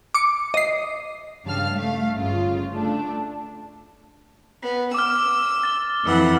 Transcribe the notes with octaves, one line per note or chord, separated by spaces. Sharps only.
D6 C#7
D#5 C7
G2 C#3 F5 A5 F6
A3 F5
G1 C#3 F4
A3 D4
B3
D6 E6 F6
A6 G7
F2 E3 F#5